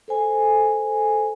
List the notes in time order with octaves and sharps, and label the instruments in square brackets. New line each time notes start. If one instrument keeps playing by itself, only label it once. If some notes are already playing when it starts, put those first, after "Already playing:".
[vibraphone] A4 C5 G#5